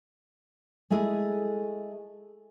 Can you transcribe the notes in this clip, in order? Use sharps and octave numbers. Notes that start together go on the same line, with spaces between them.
G#3 A3 E4 G#4 A4